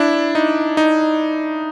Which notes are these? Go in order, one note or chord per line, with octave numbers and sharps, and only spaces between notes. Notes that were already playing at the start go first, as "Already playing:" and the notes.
Already playing: D4 E4
D#4
D#4